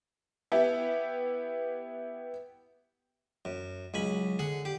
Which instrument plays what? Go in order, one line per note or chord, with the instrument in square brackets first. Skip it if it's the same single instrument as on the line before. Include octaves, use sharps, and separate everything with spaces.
[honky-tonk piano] B3 E4 G4
[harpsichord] F#2
[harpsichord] C#2 G#5 B5 [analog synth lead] F#3
[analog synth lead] D3 [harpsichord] G#4 F#5
[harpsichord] G4